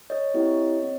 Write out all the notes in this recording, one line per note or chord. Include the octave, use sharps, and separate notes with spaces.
C#5 D#5
C4 E4 G4
C4